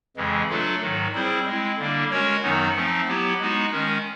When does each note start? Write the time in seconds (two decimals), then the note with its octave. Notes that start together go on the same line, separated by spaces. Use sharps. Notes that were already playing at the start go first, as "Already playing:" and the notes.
0.16 F2 C#3 E3 G#3
0.49 F#3 A3 D4 F4 A4
0.81 G#2 D#3 F#3
1.14 G3 C4 E4 G#4 C5
1.46 G#3 C4 E4
1.78 D3 G3 A#3 D4
2.11 G#3 C#4 F#4 A#4 C#5
2.43 F#2 D#3 F#3 B3 D#4
2.76 F3 A3 C4 D#4
3.08 F#3 B3 E4 G4
3.40 G#3 B3 D#4 F#4
3.72 D#3 G#3 C#4